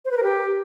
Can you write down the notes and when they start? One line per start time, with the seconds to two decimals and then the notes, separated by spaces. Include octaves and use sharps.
0.05 C5
0.11 B4
0.17 A#4
0.23 G4